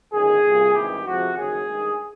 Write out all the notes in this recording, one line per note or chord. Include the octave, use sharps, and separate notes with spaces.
G1 F#2 D#3 G#4
C2 A#2 G3
G#1 G2 E3 G4
F2 C3 F3 G#3 F#4
F#1 F#2 D#3 F#3 G#4
G2 D#3 G#3